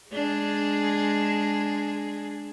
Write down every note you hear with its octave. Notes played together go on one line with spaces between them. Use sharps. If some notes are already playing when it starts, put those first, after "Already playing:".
G#3 D4 G#4